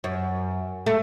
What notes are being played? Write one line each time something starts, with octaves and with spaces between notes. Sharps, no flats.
F#2
A3